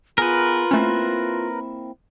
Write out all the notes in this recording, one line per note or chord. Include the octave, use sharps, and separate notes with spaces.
B3 F4 G#4 A#4 B4
A3 A#3 C4 C#4 E4